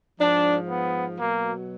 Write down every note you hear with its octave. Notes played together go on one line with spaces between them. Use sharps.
G#2 F3 D4
B3
B2 F#3 A#3